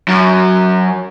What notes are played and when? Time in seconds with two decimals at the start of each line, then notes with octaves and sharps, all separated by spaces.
0.08 F#2